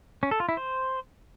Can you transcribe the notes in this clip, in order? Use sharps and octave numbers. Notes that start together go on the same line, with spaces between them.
C#4
A4
F4
E4
C5